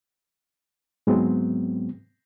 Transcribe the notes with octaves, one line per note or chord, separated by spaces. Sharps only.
G#2 F#3 G#3 B3 C4